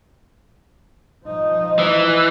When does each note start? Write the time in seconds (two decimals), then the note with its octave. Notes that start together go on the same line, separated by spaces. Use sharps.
1.26 F3 D#4
1.79 E3